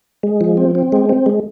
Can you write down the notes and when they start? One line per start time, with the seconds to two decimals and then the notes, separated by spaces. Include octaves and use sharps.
0.23 G#3
0.41 F3
0.57 C4
0.75 C4
0.92 G#3
1.09 C4
1.26 G#3